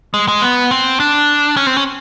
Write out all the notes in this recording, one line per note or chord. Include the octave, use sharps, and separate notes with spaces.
G#3
G#3
B3
C4
D4
C#4
C4
C#4